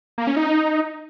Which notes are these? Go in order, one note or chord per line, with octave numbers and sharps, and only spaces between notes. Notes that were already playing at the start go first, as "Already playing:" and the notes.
A#3
C#4
D#4